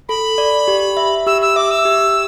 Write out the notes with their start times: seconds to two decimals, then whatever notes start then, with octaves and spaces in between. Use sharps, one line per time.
0.09 A4 B5
0.38 D5
0.68 G4
0.97 E5
1.27 G4 E6
1.42 E6
1.56 E5 D6
1.71 E6
1.85 G4